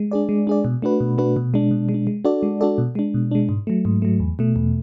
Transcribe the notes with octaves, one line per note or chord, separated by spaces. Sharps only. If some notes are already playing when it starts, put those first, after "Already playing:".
Already playing: G#3
D4 G#4 D5
G#3
D4 G#4 D5
B2
A3 D4 F#4 B4
B2
A3 D4 F#4 B4
B2
G#3 D4
B2
G#3
D4
G#3
D4 F#4 A4 D5
G#3
D4 F#4 A4 D5
B2
G#3 D4
B2
G#3 D4
G#2
F#3 A3
G#2
F#3 A3
E2
B2 A3
E2